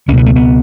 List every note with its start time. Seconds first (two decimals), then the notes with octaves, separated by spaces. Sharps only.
0.08 C#2 C#4
0.13 B2 B3
0.26 A3
0.36 B3